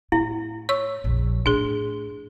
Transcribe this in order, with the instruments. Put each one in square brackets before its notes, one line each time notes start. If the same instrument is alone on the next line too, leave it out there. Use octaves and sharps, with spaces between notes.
[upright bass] A2 [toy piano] E4
[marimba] C#5 C#6 E6
[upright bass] A#1 F2
[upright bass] A2 [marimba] D4 G#4